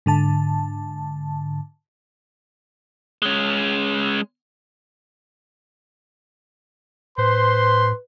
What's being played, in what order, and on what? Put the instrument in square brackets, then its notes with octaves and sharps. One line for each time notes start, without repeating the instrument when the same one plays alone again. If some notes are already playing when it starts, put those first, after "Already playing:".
[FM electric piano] G#2 D3 A5
[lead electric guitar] G#3 C#4
[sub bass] A2 [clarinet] B4 [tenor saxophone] C5 [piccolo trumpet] C6